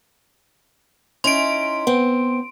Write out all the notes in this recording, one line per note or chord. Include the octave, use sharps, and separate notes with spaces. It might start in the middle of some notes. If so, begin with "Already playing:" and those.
C#4 D#4 E4 C6 D7
B3 C4